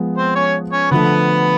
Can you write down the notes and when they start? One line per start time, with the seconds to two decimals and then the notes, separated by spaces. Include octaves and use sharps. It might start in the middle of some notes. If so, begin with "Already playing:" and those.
Already playing: F3 G#3 B3
0.17 C4 C5
0.35 C#4 C#5
0.73 C#4 C#5
0.91 D3 F3 A3 B3 B4